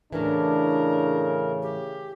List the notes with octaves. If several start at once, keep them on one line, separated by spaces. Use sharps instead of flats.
A2 C#3 E3 D4 A#4
G4